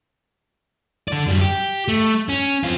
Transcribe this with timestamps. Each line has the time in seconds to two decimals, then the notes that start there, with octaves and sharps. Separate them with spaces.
1.08 D3 D5
1.27 F#2 G3
1.41 G4
1.88 A3
2.29 C#4
2.63 C4 F4